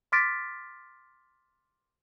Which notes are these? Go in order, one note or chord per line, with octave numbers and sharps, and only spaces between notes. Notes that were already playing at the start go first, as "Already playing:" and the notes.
C6 D6 F6 A6 B6 D7